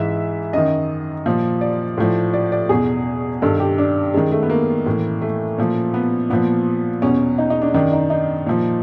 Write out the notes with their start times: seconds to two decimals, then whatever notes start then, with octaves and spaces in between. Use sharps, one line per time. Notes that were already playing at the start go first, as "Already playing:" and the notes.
Already playing: G#2 E3 E5
0.53 F#2 D#3 D#5
1.26 A#2 F3
1.61 D5
1.98 A2 F3
2.33 D5
2.52 D5
2.69 E2 B2 G#4
3.42 G2 D#3 A4
3.60 G4
3.78 D4
4.14 F#2 D#3 G#3
4.32 A3
4.43 B3
4.50 A#3
4.86 A2 E3
5.22 A3
5.58 A#2 F3
5.94 B3
6.30 A#2 F3 B3
7.02 E2 B2 C#4
7.38 D#4
7.50 D#4
7.62 D4
7.74 F#2 D#3 D4
7.93 D#4
8.10 D#4
8.47 A#2 F3